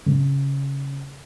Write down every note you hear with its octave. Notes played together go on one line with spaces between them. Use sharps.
C#3